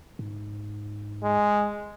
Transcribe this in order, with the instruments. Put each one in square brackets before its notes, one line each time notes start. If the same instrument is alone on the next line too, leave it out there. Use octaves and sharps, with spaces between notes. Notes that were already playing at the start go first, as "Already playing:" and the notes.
[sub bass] G#2
[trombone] G#3